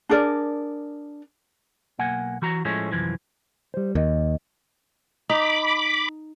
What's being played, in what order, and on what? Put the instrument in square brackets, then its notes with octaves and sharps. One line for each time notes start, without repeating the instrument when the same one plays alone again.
[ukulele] D4 G#4 A#4 D5
[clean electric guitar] B1 A#3 F#5 G#5
E3 F#4 A#5
A2 F3 G#3 A3 C#4
C2 F#2 E3 F3
G3 C5
[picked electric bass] D#2 [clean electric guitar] A#4 D#5
[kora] D#4 [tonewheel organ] B5 D6